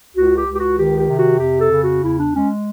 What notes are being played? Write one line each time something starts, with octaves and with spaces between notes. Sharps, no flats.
C#2 F#4
G4
C#2
G4
F#4
D#3 G4
G4
C3
F#4
F2 G4
A4
C#3
F#4
E2 E4
D4
G#3 C#4